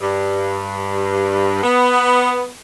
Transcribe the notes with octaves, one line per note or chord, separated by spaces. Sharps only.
G2
B3